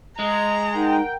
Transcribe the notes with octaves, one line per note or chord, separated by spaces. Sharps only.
G#3 A#5
D#4 A#4 F#5 G5